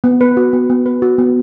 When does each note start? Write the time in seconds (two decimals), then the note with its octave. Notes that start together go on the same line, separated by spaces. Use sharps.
0.04 B3
0.21 B4
0.37 F#4
0.53 B3
0.70 B3
0.86 B4
1.02 F#4
1.18 B3